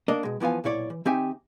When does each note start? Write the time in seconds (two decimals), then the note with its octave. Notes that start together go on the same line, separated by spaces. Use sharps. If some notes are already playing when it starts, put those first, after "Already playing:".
0.08 A#3 D4 A#4 D#5
0.23 B2 G#3
0.40 E3 F3 B3 F5 G#5
0.64 B1 A#2 E4 C#5 D5
0.90 E3
1.05 D#3 C4 D#4 G4 E5 G#5